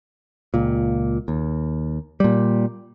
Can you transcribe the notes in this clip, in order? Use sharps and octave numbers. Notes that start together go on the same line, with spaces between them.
C#2 A#2
D#2
A#2 G3